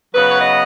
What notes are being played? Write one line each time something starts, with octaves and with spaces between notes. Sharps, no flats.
C#3 F#3 B3 B4
C#5
D#5